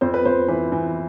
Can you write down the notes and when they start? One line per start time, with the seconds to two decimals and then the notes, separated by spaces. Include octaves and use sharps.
0.01 F2 C5
0.14 B4
0.25 F2 C5
0.48 E3 B4
0.72 E3